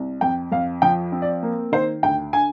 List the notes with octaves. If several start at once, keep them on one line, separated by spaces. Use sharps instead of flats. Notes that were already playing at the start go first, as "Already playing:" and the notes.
Already playing: C2
F2 G5
F2 F5
F3 G5
C4
D5
A#3
D#3 C5
D2 G5
D3 G#5